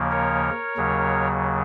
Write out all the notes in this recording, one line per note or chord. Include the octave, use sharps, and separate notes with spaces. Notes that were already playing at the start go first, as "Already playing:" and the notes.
Already playing: D#2 C#3 F3 A#3
A#4 C#5
D#2 C#3 F#3